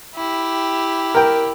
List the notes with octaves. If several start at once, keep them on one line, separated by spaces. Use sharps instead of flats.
E4 G4
A#4 G5